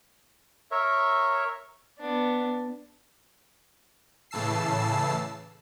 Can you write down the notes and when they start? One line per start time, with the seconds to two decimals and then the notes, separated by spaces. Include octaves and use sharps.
0.71 A#4 C#5 E5
2.00 B3 D4
4.31 A2 C#3 E3 A5 E6 C7